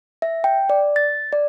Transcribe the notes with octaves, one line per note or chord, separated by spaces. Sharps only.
E5
G5
D5
A6
D5